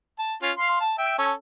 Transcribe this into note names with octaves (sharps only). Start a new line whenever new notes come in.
A5
C#4 F4
F5 C6
A5
E5 G5
C#4 A4